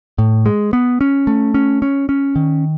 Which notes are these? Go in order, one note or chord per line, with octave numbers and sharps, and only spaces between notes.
A2
G#3
B3
C#4
A3
C#4
C#4
C#4
D#3